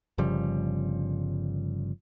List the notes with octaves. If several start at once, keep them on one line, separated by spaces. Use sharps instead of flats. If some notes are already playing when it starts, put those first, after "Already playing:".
G1 C#3 F3 G3